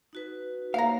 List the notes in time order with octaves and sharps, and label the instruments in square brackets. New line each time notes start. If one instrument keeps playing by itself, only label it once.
[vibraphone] D#4 F#4 B4
[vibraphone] A#3 C#5 [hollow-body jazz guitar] F5 A#5